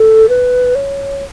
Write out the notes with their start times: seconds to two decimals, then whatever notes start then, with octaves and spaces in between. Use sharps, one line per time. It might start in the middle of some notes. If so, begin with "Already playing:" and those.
Already playing: A4
0.29 B4
0.75 C#5